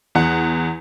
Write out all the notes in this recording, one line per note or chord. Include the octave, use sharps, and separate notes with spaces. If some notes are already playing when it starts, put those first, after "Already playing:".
E2 F#5